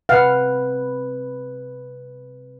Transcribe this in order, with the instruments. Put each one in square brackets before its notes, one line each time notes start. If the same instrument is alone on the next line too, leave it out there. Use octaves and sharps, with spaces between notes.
[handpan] C3 B4 [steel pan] F5 F#5